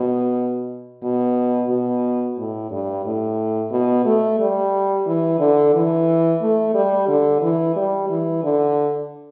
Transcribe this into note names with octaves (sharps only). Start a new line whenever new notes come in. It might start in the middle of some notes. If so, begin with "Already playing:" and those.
Already playing: B2
B2
B2
A2
G2
A2
B2
A3
G3
E3
D3
E3
A3
G3
D3
E3
G3
E3
D3